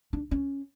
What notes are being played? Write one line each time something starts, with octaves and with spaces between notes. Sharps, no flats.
D4
C#4